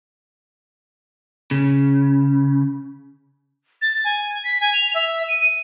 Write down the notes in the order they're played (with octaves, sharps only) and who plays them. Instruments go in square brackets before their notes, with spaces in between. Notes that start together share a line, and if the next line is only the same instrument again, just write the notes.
[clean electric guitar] C#3
[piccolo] A6
G#5
B6
G#5
F7
E5
D#7